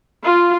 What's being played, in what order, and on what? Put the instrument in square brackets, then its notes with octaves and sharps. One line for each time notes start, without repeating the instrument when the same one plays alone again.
[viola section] F4